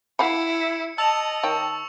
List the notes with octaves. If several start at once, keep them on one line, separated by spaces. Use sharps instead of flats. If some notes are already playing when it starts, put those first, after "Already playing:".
E4 F5 F#5 B5 C#7
D#5 A5 E6 F7
D#3 C#5 G5 C#6